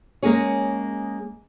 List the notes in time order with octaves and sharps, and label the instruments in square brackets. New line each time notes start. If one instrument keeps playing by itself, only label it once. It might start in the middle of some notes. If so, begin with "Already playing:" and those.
[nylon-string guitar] G#3 A#3 C#4 G#4 C#5